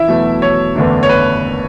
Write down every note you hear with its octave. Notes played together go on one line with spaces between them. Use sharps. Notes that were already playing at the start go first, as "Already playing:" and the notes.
Already playing: E4 E5
E2 B2 F#3 A3
C#5
F#1 E2 D3 A3 D4
C#5
B4